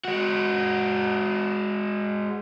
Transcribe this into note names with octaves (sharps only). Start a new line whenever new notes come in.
G#3 F#4